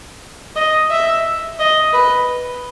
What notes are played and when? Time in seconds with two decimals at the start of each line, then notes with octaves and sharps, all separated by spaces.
0.56 D#5
0.91 E5
1.59 D#5
1.93 B4